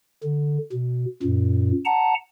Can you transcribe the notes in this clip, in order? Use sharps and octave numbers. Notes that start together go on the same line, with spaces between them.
D3
B2
F#2 A#2
F#5 A5 A#5